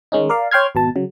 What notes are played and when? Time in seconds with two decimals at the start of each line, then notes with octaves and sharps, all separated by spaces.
0.12 D#3 G#3 C#4 D#4
0.29 A#4 D5 F5
0.51 C#5 G5 C6 F6 G#6
0.75 G#1 B2 A5
0.96 C#3 F#3